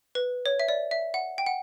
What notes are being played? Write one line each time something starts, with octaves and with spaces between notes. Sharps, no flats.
B4
C#5
E5
D5
E5
F#5
G5
F#5